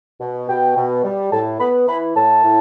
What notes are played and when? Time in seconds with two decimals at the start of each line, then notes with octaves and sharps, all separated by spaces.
0.20 B2
0.49 B2 G5
0.77 B2
1.04 G3
1.32 A2 A5
1.60 B3 B5
1.88 E3 B5
2.16 A2 A5
2.44 A2